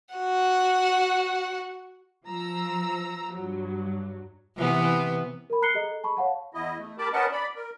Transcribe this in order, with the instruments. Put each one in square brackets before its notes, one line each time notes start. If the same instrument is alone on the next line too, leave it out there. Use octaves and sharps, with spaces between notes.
[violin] F#4 F#5
[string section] F3 A#5 E6
G2 F#3
[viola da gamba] C3 E3 B3
[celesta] A#4 B5
A#5 F#6 C7 C#7 G7
G#4 A4 D#5
A5 B5 C#6
C#5 F5 F#5 A5
[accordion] E2 E4 D#5
A3
G4 A#4 A5 B5 D6
C#4 A#4 B4 D#5 F#5 A5
D5 B5
A#4